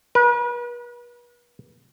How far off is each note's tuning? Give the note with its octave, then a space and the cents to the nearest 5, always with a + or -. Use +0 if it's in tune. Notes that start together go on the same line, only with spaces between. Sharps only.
B4 -40